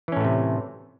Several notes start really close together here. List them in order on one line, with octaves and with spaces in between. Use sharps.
E3 C#4 A2 A3 C3